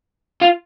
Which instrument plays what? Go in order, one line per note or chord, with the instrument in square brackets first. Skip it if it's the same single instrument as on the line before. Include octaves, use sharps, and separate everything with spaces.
[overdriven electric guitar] F4